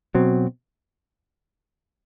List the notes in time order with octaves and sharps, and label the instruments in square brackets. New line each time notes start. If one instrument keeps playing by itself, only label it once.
[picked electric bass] B2 F#3 C4